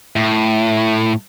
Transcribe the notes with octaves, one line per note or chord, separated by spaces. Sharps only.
A2